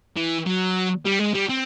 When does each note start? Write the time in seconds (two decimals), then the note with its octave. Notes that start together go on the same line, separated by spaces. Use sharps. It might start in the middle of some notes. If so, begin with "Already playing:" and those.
0.17 E3
0.47 F#3
1.06 G3
1.19 G#3
1.34 G3
1.49 C4